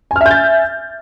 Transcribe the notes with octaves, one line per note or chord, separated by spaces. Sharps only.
E5 G#5 F6 G6 A6